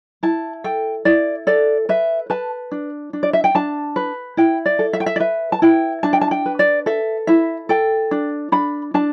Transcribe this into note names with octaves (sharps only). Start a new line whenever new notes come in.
E4 A5
A4 G5
E4 D5
A4 D5
B4 E5
B4 A5
D4
D4
D5
E5
G5
D4 A5
B4
E4 G5
D5
A4
E5
G5
E5
D5
B4 E5
A5
E4 G5
D4 A5
G5
A5
G5
B4
D5
A4 E5
E4 E5
A4 G5
D4
D4 B5
D4 A5